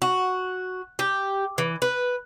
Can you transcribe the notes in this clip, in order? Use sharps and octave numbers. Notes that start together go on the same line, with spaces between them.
F#4
G4
E3
B4